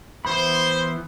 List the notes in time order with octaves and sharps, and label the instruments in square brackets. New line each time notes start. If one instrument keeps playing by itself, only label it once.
[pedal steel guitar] E3 B3 B5 [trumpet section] C5